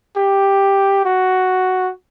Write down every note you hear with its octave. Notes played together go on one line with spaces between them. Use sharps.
G4
F#4